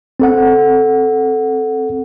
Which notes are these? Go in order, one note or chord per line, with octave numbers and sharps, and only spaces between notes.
C4 A4 F#5